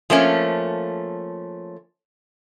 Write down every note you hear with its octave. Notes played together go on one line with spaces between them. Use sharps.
F3 A3 A#3 C#4